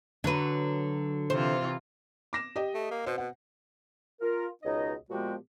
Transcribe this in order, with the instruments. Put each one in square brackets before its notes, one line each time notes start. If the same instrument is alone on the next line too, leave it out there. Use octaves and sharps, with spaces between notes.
[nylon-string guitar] D3 [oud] F#3 B4
[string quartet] C3 E3 F4 [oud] C5
[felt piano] D6 A#6 E7
G4 D#5
[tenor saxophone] A3
A#3
[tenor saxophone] B2 [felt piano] C5
[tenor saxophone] B2 [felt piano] F#5
[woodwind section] F4 A#4
C#2 B2 D#4 C#5 D#5
A#2 F3 G#3 B3 F#4 G4